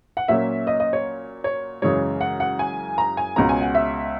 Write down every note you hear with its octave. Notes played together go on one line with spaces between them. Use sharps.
F#5
A#2 F#3 A#3 C#4 E5
D#5
D#5
C#5
C#5
F#2 C#3 E3 G#3 C#5
F#5
F#5
G#5
A#5
G#5
C#2 B2 G#3 C#4 A#5
G#5
F#5
E5